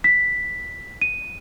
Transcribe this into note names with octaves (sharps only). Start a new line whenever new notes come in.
B6
D#7